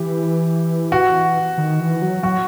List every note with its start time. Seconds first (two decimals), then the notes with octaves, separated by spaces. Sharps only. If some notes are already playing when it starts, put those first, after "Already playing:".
Already playing: E3 G4
0.92 F#4
1.58 D#3
1.80 E3
2.02 F#3
2.23 F#3 F#4